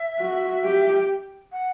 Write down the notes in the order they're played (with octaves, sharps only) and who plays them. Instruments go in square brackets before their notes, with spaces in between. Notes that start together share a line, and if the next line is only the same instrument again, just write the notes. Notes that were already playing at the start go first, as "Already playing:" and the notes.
Already playing: [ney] E5
[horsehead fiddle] F#4
G4
[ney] F#5